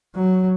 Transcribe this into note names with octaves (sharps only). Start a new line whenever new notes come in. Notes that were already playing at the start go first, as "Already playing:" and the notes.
F#3